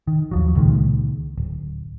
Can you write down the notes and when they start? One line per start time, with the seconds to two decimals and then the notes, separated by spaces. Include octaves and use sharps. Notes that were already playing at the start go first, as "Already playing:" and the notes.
0.07 D#3
0.31 D#2 F3 F#3
0.55 C#2 A#2 D#3 G#3
1.37 D1